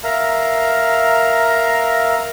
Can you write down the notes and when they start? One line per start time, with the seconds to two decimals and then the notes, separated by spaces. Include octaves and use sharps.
0.04 A#4 E5 F5 A#5